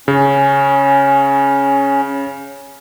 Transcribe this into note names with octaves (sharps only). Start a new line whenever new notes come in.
C#3 C#4